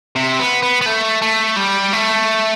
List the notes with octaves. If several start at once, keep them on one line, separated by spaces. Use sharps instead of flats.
C3
B3
B3
B3
A3
A3
G3
A3